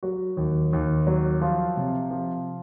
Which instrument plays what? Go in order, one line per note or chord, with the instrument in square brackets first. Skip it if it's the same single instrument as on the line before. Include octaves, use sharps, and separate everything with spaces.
[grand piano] F#3 F#4
D#2
D#2
F#3
F3 F4
C3
F3